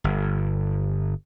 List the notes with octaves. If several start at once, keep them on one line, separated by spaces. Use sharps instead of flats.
G1